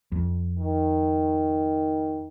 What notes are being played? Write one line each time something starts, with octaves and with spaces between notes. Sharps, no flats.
F2
D#3